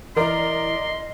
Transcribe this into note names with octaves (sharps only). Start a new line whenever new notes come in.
E3 E4 A#4 D5 D#5 A#5 C6